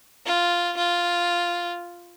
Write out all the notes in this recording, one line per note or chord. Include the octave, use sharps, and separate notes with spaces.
F4
F4